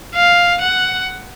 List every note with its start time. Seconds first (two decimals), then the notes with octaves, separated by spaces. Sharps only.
0.15 F5
0.61 F#5